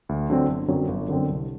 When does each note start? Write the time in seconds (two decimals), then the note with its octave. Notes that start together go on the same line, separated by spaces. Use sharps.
0.09 D2
0.30 D3 F#3 C4
0.48 G1
0.68 F#2 D3 F#3 C4
0.88 G1
1.08 F#2 D3 F#3 C4
1.29 C2